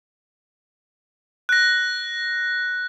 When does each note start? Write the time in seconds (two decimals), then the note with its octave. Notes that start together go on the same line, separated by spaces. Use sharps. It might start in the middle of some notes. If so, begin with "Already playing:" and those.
1.49 F#6 A#6